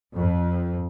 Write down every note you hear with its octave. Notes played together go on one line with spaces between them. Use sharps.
F2